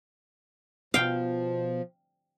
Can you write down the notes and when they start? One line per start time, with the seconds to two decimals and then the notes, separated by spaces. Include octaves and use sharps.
0.94 B2 F3 B3 F5 G5